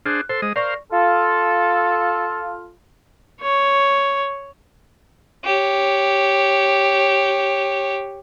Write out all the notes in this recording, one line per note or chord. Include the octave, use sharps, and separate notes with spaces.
D4 G#4 C5 F6 F#6
A4 C5 C6
G#3 D#5
A#4 C5 D5 F5 C#6 A#6
F4 A4
C#5
G4 C#5